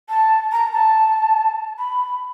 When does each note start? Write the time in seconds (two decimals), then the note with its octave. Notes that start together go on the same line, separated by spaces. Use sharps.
0.09 A5
0.52 A#5
0.73 A5
1.78 B5